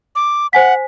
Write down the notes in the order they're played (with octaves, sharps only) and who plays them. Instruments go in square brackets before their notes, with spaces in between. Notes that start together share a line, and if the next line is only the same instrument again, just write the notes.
[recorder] D6
[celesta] C5 G#5 B6 [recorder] F#5